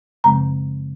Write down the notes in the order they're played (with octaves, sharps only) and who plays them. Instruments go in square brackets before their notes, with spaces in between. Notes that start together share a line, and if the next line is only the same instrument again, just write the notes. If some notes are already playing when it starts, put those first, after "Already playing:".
[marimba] F#2 C#3 F3 G#3 C4 A#5